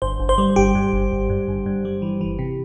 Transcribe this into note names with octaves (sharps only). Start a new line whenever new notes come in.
G1 C5
G1
C5
G3
G1 G4
G2
G1
G1
G2
G1
G2
G3
E3
E3
C3